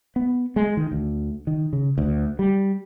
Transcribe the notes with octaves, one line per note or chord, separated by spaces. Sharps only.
B3
G#3
D#3
D2
D#3
C#3
D2
G3